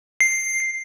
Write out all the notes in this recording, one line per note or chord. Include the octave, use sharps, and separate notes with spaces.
C7